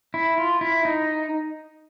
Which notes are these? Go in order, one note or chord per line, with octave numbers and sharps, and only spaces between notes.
E4
F4
E4
D#4